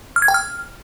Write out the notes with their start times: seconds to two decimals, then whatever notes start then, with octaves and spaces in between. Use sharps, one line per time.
0.16 F6
0.22 G#6
0.28 G5
0.34 F6